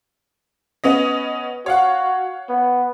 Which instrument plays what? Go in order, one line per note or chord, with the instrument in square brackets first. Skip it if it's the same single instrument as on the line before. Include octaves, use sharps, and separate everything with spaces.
[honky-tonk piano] B3 C#4 D#5
[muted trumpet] F#4 [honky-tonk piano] C#5 F5 F#5
[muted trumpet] B3